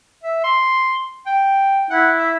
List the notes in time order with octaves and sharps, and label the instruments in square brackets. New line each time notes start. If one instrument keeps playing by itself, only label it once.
[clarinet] E5
C6
G5
[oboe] E4 [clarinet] F#5
[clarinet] E5